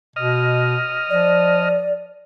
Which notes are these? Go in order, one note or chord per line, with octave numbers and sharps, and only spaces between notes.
B2 D#5 F6
F3 D5